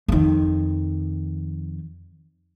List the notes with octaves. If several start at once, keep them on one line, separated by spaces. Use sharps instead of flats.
F2 D#3